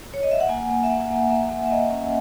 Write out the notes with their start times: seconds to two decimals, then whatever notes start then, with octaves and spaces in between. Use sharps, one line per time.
0.14 C#5
0.23 D#5
0.31 E5
0.41 F#5
0.49 A#3 G#5
0.70 A#3
0.83 E5
0.90 A#3 F#5
1.11 A#3
1.30 A#3 E5
1.50 A#3
1.66 E5
1.71 A#3 D#5
1.91 C#4